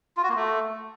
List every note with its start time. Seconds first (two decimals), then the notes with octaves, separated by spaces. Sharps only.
0.17 F4
0.23 F#4
0.29 A#3
0.35 A3